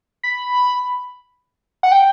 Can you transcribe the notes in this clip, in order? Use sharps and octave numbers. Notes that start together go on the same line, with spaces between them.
B5
F#5
G5